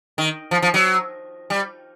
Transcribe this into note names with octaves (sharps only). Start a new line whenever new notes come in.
D#3
F3
F3
F#3
G3